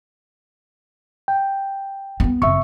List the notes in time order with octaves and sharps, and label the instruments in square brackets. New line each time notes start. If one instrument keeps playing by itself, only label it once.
[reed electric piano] G5
[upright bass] B3 D4
[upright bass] F#1 C4 [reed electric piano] E5 C#6